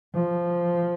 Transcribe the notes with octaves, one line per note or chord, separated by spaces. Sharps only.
F3